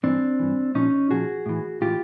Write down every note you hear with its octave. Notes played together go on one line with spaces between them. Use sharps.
G2 E3 C4 D4
G2 E3
A#2 F3 C#4 D#4
A#2 F3 F#4 G#4
A2 E3
A2 E3 F4 G4